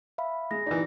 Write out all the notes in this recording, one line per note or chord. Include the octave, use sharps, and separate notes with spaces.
E5 F5 B5
G#3 A#6
E3 D#4 D5